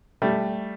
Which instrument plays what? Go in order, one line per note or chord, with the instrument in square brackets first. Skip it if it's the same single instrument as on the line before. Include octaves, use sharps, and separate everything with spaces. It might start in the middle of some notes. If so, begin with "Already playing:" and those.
[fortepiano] G3 A3